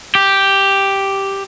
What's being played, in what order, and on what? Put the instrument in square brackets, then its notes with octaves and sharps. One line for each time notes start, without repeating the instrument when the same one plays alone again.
[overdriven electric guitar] G4